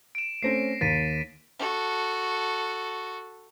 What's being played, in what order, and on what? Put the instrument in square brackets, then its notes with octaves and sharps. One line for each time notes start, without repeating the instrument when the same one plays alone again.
[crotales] D7 E7
[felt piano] A3 C4 C#4 [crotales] A#6 C7
[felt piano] D#2 [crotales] A6 B6 D#7
[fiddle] F#4 A4